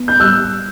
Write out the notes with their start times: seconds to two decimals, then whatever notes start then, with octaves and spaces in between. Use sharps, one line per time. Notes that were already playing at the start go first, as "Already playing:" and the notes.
Already playing: B3
0.08 G6
0.20 G3 E6 F#6